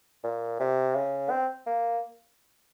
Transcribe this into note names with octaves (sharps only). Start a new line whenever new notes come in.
A#2
C3
C#3
C4
A#3